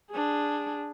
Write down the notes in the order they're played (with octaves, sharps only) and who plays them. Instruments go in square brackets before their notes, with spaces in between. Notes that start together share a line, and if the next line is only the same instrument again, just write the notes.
[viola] D4 G#4